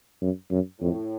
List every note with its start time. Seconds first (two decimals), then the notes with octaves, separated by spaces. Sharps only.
0.21 F#2
0.51 F#2
0.80 F2 A2